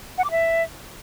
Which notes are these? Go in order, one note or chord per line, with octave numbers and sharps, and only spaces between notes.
F#5
D6
E5